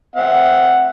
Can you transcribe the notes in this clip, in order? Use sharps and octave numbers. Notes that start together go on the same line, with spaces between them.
C4 E5 F#5